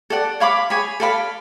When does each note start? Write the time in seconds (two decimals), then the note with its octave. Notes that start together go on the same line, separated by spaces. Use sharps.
0.10 A4 D5 F#5
0.40 C#5 F5 B5 D6
0.70 G#4 C#5 G#5 B5
1.00 A4 D5 F5 B5